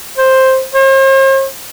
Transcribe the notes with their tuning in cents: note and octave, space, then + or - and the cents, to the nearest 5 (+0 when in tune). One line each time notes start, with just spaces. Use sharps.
C5 +5
C5 +45